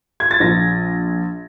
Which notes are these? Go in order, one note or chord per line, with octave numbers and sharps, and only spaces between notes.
G#6
A6
A#1 A#6